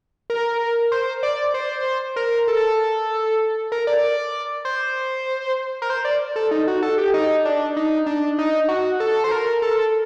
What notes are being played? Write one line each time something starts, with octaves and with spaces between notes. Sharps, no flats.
A#4
C5
D5
C5
A#4
A4
A#4
D5
C5
A#4
C5
D5
A4
D#4
F#4
A4
G4
D#4
D4
D#4
D4
D#4
F#4
A4
C5
A#4
A4